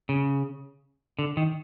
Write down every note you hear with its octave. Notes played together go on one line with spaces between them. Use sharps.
C#3
D3
D#3